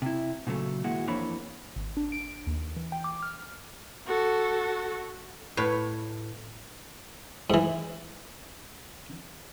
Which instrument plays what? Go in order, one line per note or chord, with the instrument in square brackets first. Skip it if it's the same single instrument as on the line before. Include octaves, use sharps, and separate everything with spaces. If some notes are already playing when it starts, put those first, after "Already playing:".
[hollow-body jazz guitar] C3 E4
A#2 C#3 F#3 A3
D#2 A#2 G#3 E4 F#4
F2 E3 A#3 D4 C#5 B5
[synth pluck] G#1
D4
D7
D#2
E3
G5
D6
F6
[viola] F#4 A4
[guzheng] A2 B4 C#5
[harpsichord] G#2 E3